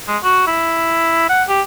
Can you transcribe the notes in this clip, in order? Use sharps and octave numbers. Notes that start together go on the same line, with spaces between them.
G#3
F#4
E4
F#5
G4